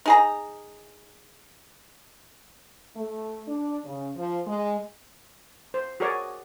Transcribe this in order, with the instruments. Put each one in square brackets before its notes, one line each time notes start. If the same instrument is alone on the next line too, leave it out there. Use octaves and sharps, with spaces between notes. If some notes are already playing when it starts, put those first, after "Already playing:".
[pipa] D#4 G#4 A#5
[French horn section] A3
D4
C#3
F3
G#3
[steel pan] C5
F#4 G#4 A#4 C#5 D5 G#5